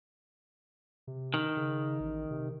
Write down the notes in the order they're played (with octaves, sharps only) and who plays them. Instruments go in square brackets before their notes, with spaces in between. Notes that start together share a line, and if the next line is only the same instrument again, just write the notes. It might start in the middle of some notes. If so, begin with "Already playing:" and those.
[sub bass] C3
[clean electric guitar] D#3
[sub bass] C#3
A1
C3